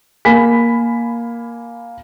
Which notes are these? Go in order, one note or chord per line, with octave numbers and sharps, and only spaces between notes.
A#3 G#5 B5 B6